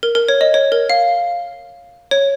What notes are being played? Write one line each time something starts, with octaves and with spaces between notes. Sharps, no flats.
A#4
A#4
C#5
D#5
C#5
A#4
F5
C#5